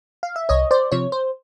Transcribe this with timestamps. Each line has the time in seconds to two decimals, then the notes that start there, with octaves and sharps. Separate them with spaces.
0.23 F5
0.36 E5
0.49 C2 C#5 D#5
0.71 C5 D5
0.92 C3 F3 C#5
1.12 C5